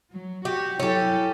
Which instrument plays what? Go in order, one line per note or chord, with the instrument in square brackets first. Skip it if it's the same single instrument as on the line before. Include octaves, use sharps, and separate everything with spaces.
[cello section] F#3
[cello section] F#4 [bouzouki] G4
[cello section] F#3 E4 A4 [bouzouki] C#4 G4